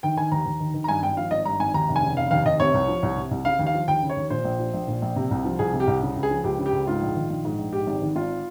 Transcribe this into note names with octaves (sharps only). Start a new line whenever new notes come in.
D#3 G5
D#3 G#5
D#2 A#5
D#2
D#3
D#3
A#5
G2 G#5
G#1 G5
F3 F5
G#1 D#5
G2 A#5
G#1 G#5
D#2 A#5
F1
G#5
C#3
F1 F5
D#2 F5
F1 D#5
C3 C#5
C2
F3
C2
C3
C2
C#3 F5
D#2
F5
F3
D#2 G5
C#3
C#5
D#2
A#2 C5
A#1
F3
A#1
A#2
A#1
C3
C2
F3
C2 G#4
C3
G4
C2
C#3
C#2
G#4
F3
C#2 G4
C#3
G4
C#2
G#2 F4
A#1
D#3
A#1
G#2
A#1
G#2 G4
G#1
D#3
G#1 F4